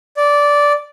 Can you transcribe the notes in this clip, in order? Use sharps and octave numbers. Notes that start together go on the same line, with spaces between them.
D5